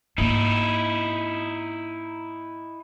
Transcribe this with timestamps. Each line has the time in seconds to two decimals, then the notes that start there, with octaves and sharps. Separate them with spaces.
0.18 G#2 A#3 D#4 E4